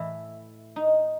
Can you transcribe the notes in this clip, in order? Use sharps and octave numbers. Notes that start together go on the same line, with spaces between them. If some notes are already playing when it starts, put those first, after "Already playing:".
Already playing: A2 E3 E4
D#4